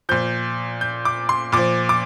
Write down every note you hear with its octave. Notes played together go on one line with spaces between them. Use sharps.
A#2 F3 G6
G6
D6
C6
A#2 F3 D6
D6